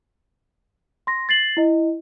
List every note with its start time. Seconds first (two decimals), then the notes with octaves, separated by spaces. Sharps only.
1.07 C6 A#6
1.29 A6 C7 F#7
1.57 E4 D#5